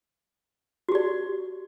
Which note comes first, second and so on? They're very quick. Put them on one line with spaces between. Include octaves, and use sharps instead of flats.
F#4 G4 D5